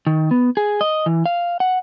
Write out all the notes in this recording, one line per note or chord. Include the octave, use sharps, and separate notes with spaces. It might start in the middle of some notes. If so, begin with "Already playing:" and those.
D#3
B3
G#4
D#5
E3
F5
F#5